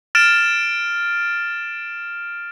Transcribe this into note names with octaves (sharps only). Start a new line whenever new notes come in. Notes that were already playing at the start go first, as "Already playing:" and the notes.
F6 A6 D7 E7